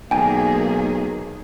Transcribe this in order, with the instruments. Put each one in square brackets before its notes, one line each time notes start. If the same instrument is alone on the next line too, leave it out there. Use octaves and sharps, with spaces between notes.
[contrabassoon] B1 [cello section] D#3 A#3 G#4 [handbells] G5 G#5